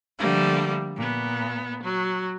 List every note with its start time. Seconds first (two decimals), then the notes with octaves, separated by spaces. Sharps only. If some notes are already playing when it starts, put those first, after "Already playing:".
0.18 D3 F3 G3 A3 A#3
0.96 A#2 B3
1.83 F#3